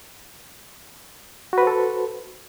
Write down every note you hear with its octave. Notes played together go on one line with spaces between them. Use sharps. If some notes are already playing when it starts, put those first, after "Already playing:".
F#4 A4 B4 C5